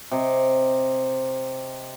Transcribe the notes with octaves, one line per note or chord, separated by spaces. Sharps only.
C3 D#5